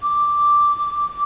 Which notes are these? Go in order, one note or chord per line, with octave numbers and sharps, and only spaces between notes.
D6